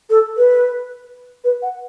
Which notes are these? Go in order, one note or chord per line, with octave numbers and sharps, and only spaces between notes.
A4
B4
B4
F#5